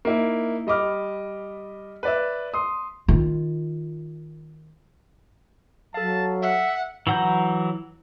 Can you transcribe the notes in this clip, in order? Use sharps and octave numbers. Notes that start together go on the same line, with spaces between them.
A#3 D#4 E4
G3 D#5 B5 D6 F6
B4 D5 E5
C6 D#6
D#3 F4
F#3 A4 F5 A5
E5 F#5
E3 F#3 F#5 A#5 G6